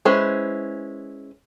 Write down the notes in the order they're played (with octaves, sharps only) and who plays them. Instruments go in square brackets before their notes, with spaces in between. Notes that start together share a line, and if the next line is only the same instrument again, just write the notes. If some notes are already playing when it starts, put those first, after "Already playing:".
[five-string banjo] G#3 C#4 E4 B4 C5